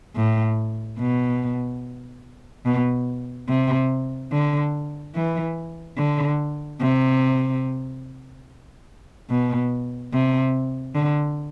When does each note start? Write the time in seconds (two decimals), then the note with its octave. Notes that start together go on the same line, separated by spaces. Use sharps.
0.16 A2
0.99 B2
2.65 B2
3.49 C3
4.31 D3
5.15 E3
5.98 D3
6.81 C3
9.30 B2
10.13 C3
10.95 D3